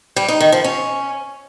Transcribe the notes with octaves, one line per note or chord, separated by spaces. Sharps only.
G3
D#4
D#3
F3
C#4